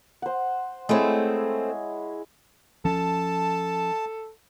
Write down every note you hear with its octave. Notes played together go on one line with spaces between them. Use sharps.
C5 F#5
G#3 A3 C4 E4 C#5
F3 C#4 A4 A5